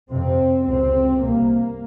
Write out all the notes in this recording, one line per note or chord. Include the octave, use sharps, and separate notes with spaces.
F2 C3 C4
C#2 C3 C4
C2 C3 A#3